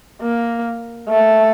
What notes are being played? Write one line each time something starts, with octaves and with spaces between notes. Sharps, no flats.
A#3
A3